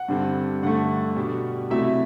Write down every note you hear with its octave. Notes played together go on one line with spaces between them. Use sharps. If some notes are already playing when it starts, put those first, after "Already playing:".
Already playing: F#5
G2 D3 G3 C4
G2 D3 A3 F#5
B2 G3 D4
C3 F#3 A3 E4 E5